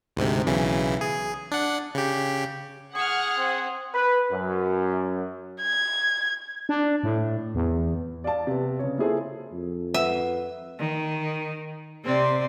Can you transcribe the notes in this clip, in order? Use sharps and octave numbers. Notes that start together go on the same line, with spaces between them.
D2 G#2 C3
B1 C#3 E3
G#4
D4 F#5
C#3 G4
G#4 F#5 C#6 F6
C4
B4
F#2
G#6
D4
A2
E2
D5 F5 A5
C3 B3
C#3 C#5
A#3 E4 F4 G#4 A4 C5
F2
B4 E5 F#5
D#3
C3 C4 D5